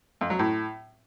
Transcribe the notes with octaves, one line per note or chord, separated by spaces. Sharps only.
F2
F#3
A2